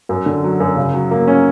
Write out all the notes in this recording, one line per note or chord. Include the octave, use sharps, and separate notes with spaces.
F#2
D3
F#3
F#2
C#3
F#3
A#3
C#4